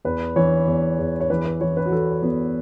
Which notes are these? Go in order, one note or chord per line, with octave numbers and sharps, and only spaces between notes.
E2 B4
E3 C#5
E2
E2
C#5
E3 B4
B4
E3 C#5
B4
F#4
E3 A4
E3 B3